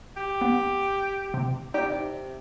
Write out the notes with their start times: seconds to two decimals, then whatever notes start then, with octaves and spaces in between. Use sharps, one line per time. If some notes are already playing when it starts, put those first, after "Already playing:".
0.17 G4
0.41 B3
1.34 C3
1.74 D#4 F#4 G4 D5
1.88 C3